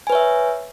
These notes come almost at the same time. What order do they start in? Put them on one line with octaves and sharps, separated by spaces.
G#5 B4 C#5 E5